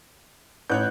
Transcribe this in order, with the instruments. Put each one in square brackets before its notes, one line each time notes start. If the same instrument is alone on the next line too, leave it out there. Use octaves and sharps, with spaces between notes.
[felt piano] A1 [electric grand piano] C#5 F#6 G6